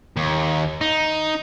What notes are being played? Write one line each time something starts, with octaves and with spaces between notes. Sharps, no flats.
D#2
D#4